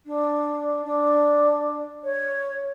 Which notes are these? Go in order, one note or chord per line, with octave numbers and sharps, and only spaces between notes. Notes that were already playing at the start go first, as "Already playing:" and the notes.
D4
D4
C#5